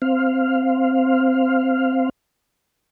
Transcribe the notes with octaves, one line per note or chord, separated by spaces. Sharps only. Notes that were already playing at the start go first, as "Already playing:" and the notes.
C4 F5